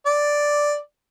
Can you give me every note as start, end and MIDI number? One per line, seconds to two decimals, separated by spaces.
0.06 0.75 74